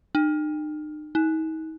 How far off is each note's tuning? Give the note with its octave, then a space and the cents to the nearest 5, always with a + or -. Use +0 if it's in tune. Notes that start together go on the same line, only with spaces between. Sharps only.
D#4 -40
D#4 +40